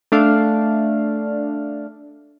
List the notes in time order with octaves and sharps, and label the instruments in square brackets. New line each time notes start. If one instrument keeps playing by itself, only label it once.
[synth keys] A3 D4 F5